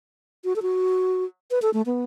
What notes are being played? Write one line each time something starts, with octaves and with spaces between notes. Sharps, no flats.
F#4
A4
F#4
B4
A4
A3
B3